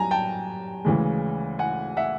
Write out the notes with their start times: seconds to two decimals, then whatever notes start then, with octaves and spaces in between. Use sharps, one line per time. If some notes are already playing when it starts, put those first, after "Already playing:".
Already playing: F#2 G3 G#5 A#5
0.11 G5 A5
0.85 D2 C#3 E3 G#3
1.59 F#5 G#5
1.97 E5 F#5